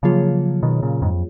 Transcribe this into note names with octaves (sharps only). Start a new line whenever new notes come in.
C#3 F3 F#3 A#3 F4 G#4 C#5
B2 D#3
A#2 C#3
F2 G#2